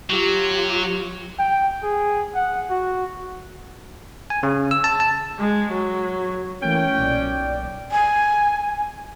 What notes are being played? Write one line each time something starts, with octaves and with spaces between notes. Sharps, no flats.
F#3 F4 G4
G5
G#4
F#5
F#4
G#5
C#3
E6
A5
A5
G#3
F#3
E3 A3 A#3 C#4 G5
B1 A#2 D5
G#5